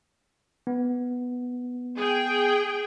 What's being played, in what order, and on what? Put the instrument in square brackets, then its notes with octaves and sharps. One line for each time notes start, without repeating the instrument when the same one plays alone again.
[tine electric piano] B3
[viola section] G#4 G5